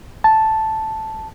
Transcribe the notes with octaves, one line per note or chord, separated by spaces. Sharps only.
A5